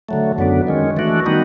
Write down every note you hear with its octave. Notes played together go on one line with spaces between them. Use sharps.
D3 F#3 A3
F#2 D3 F#3 B3 D4
D#3 G#3 C#4
E3 A3 D4 F#4
D#3 G3 B3 D#4 F#4